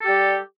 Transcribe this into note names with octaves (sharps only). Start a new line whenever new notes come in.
G3 G4 A4